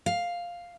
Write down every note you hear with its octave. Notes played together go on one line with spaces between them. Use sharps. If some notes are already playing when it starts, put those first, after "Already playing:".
F5